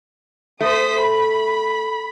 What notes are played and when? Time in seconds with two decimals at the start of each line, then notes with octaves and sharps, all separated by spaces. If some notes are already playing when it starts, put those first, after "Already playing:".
0.61 A3 C5 D#6 B6
0.99 B5